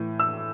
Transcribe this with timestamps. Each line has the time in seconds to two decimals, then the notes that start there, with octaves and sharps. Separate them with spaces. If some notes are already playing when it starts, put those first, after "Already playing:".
Already playing: A2 E3
0.20 E6